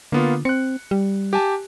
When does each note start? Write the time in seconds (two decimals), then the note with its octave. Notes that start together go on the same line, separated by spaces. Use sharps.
0.12 D3 A#3 B3 F4
0.45 C4 F#6 C#7
0.91 G3
1.33 G4 G#5 A5